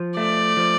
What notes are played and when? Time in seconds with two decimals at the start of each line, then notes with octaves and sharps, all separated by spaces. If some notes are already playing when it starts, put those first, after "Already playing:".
Already playing: F3
0.17 A3 D5
0.57 F3